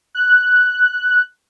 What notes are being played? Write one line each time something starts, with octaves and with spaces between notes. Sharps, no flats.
F#6